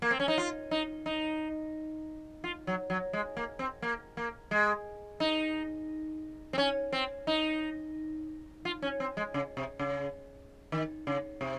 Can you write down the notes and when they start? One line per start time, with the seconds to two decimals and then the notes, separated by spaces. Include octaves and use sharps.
0.02 A#3
0.11 C4
0.20 C#4
0.28 D#4
0.38 F4
0.71 D#4
1.06 D#4
2.44 F4
2.67 F#3
2.90 F#3
3.13 G#3
3.37 A#3
3.59 C4
3.82 A#3
4.17 A#3
4.51 G#3
5.20 D#4
6.53 C4
6.58 C#4
6.92 C4
7.27 D#4
8.65 F4
8.82 C#4
9.00 C4
9.17 G#3
9.34 C#3
9.57 C3
9.79 C#3
10.72 D#3
11.07 C#3
11.41 C3